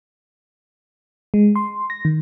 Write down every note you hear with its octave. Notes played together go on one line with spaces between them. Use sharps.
G#3
C6
A#6
D#3